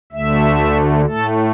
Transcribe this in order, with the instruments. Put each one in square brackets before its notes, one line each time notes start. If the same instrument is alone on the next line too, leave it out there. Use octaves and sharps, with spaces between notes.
[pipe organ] D2 D3 A3 E5
A2 A3 A4